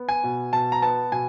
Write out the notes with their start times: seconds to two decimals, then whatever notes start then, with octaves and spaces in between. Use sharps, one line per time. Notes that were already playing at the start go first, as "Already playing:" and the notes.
Already playing: B3
0.09 G#5
0.24 B2
0.53 B2 A5
0.72 A#5
0.82 B3 A5
1.12 B2 G#5